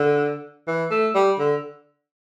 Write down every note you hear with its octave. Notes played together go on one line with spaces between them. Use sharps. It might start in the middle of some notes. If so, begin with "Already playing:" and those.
Already playing: D3
E3
A3
G3
D3